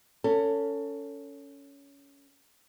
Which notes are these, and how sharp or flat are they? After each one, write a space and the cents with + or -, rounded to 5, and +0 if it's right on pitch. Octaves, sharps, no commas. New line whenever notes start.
C#4 +15 A4 +25